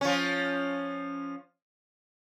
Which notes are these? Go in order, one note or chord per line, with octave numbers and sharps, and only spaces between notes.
F3 C#4